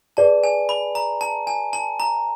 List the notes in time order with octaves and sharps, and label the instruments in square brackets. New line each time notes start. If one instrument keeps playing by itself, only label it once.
[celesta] G#4 B4 D5 [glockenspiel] A5
[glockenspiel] G#5
B5
A#5
A5
G#5
A5
A#5